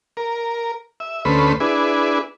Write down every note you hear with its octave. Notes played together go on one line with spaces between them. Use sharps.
A#4
E5
D2 A3 C#4 B4 C5 B5
D4 E4 G#4 B4